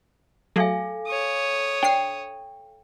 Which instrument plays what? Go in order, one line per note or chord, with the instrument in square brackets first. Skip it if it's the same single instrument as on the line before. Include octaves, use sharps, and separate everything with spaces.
[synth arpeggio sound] F#3 A3 G#4 [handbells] A4 F5 G#5
[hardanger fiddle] C#5 D#6
[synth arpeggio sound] D4 C7 [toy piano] G5